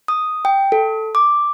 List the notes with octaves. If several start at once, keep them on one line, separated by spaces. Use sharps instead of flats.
D#6
G5
A4
D6